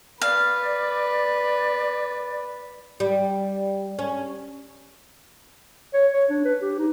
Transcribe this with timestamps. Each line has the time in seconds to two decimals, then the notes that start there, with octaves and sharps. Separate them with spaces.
0.22 B4 D5 F5
3.00 G3
3.99 C#4
5.94 C#5
6.14 C#5
6.30 D4
6.45 B4
6.62 G4
6.79 D#4